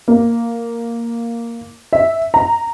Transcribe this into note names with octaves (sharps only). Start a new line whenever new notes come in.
A#3
E5
A#5